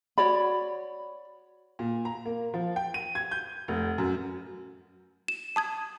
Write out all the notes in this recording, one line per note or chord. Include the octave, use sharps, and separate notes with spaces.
F#4 C#5 D5 B5
A#2
A#5
A#3
F3
G5
D#7
G#6
G6
F1
F#2
E7
A5 D#6 G#6